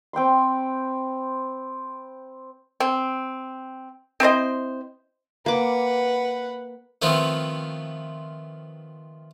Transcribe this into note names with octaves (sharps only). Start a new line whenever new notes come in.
C4 G5 B5 C6
C4
C4 E4 C5 D#5
A#3 B4 F#5 D6
D#3 F3 A3 B3 C4 F4